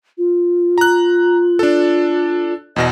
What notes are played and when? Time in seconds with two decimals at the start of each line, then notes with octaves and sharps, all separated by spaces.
0.18 F4
0.78 A#5 F#6
1.59 D4 A4
2.76 E2 B2 D#5 A#6